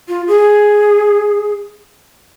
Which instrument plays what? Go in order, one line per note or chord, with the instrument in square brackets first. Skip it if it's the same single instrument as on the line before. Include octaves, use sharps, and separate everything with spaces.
[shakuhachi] F4
G#4